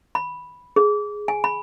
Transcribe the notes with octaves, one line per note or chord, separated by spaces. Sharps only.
B5
G#4
G#5
B5